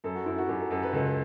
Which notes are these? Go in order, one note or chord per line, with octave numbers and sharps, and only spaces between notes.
F#2 A4
F#4
F#2 E4
F#4
F#2 G4
A4
F#2 A4
B4
C#2 A4